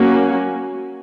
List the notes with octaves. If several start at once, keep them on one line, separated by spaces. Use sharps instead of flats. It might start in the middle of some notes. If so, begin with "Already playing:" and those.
Already playing: F#3 A#3 C#4 F#4